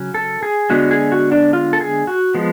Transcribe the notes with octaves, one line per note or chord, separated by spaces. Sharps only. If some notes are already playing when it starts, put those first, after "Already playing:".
Already playing: C#3 F#3 C#4
A4
G#4
D3 G#3 B3 F#4
G#4
F#4
D4
F4
A4
G#4
F#4
F3 G#3 B3